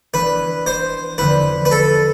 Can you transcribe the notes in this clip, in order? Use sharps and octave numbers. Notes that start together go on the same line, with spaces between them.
E3 B3 D4 B4
C5
E2 D3 F3 C4 E4 B4
B4
A4